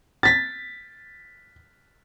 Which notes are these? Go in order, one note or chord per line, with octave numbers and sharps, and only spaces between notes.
A6 B6